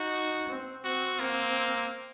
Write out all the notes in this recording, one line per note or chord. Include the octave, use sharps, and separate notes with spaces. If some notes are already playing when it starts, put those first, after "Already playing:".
Already playing: D#4 F#4
C4
C4 F#4
A#3 C4